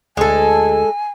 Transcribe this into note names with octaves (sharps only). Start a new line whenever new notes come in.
D2 G#3 A4 G#5